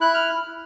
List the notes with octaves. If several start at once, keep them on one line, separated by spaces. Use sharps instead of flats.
E4 F#6
F6